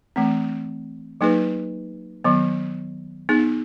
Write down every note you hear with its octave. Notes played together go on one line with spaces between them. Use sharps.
E3 A3 C4
F#3 A#3 D#4 G#4 B4
D#3 F#3 B3
B3 D#4 G#4